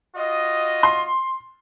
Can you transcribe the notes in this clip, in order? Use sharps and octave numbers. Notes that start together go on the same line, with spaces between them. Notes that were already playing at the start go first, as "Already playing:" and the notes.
F4 F#4 D#5
C6